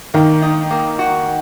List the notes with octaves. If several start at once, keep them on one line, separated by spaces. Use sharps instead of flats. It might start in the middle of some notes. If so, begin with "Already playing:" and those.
D#3 A#3
D#4
A#3
F#4